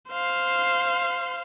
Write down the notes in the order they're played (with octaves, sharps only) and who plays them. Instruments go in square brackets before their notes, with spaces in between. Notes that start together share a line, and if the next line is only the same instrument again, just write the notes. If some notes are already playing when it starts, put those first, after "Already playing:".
[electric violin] C5 F5